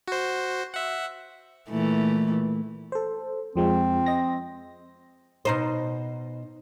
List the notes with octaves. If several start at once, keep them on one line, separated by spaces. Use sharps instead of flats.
F#4 C5
E5 F#5
A#2 E3 A3
A4 C5
F2 F3 G#3 C4
D#5 A#6
B2 D#4 C5